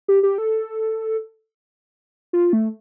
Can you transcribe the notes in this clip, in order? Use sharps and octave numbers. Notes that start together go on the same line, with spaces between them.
G4
G4
A4
F4
A3